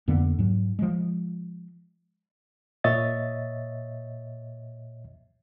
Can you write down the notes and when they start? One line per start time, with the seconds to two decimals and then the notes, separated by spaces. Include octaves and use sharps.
0.08 F2 D3 A#3 B3
0.39 G#2 F#3
0.79 F3 G#3
2.84 A#2 C#5 D#5 E5 A6